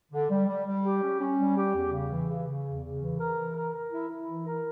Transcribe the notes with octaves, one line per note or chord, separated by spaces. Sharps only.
D3
G3
G3
G3
G4
C#4
C#4
G3
G4
E2
C#3
E3
C#3
C#3
E2
C#3
E3
A#4
E3
A#4
A#4
E4
E4
E3
A#4